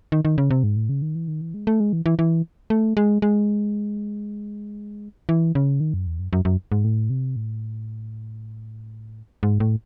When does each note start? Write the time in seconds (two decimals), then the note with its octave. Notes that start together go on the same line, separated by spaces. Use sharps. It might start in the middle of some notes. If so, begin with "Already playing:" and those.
0.12 D#3
0.25 D#3
0.38 C#3
0.51 C3
0.63 G#2
0.76 A2
0.89 C#3
1.02 D#3
1.15 E3
1.28 D#3
1.41 E3
1.54 G#3
1.67 A3
1.80 G#3
1.93 E3
2.06 E3
2.19 E3
2.70 A3
2.97 G#3
3.22 G#3
5.29 E3
5.55 C#3
5.80 D#3
5.94 F#2
6.07 E2
6.19 F#2
6.33 F#2
6.45 F#2
6.72 G#2
6.84 A2
7.10 C3
7.36 A2
9.43 G#2
9.60 A2